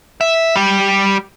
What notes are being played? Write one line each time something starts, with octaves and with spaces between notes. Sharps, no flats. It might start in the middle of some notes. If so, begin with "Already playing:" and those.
E5
G3 G4